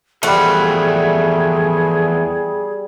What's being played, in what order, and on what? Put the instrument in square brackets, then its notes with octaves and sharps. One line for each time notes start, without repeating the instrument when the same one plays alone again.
[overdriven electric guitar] E2 F3 [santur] G3 F#5 [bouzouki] A3 [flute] G#4